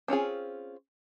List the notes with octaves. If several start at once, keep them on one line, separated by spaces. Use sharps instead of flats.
C4 C#4 F4 G#4